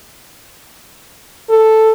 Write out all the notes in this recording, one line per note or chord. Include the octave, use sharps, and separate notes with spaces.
A4